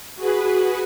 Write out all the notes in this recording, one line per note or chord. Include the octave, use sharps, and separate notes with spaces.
F#4 G#4 B4